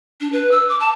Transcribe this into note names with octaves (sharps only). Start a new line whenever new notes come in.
D4
B4
E6
D6
A5